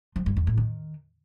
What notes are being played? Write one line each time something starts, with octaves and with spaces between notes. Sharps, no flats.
F3
G2
E2
A2
D#3